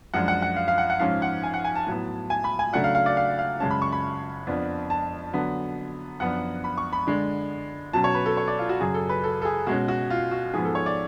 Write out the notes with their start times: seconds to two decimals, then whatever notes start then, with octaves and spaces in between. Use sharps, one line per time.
0.14 F#2 F3 G#3 D4 F#5
0.28 F#5
0.42 F#5
0.56 F5
0.68 F5
0.78 F#5
0.90 F#5
0.99 G#2 F3 G#3 C#4 F5
1.22 F#5
1.43 G#5
1.54 F#5
1.64 G#5
1.76 A5
1.87 A2 F#3 B3
2.30 G#5
2.44 B5
2.59 G#5
2.73 C#3 F#3 A3 D4 F#5
2.84 F5
2.95 F5
3.06 D5
3.17 F5
3.39 F5
3.60 F#2 C#3 G#3 C#4 A5
3.71 B5
3.82 C#6
3.92 B5
4.47 F2 F3 B3 D4
4.90 A5
5.33 D3 F#3 B3
6.20 F#2 F3 B3 D4 F#5
6.64 B5
6.78 C#6
6.93 B5
7.07 D3 G#3 D4
7.93 B2 F#3 C#4 A5
8.04 C#5
8.15 B4
8.26 A4
8.37 C#5
8.48 D5
8.59 F4
8.69 F#4
8.80 F#2 C#3 F#3 G#4
8.94 A4
9.09 B4
9.24 A4
9.42 A4
9.45 G#4
9.67 B2 G#3 C#4 F#4
9.88 F#4
10.10 F4
10.31 F#4
10.53 G#2 F3 B3 G#4
10.65 A4
10.75 C#5
10.86 D5